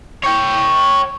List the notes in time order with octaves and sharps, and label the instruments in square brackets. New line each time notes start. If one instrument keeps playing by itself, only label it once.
[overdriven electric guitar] C#5 G5